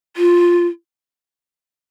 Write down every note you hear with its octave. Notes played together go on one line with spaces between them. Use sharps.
F4